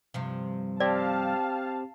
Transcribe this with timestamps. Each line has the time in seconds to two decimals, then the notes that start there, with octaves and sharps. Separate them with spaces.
0.14 G2 C3 F3
0.80 C4 G4 D5 F5 A5